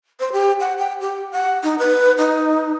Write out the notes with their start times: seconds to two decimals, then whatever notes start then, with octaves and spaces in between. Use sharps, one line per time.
0.20 C5
0.33 G4
0.60 F#5
0.79 G5
1.01 G4
1.32 F#5
1.63 D#4
1.79 B4
2.18 D#4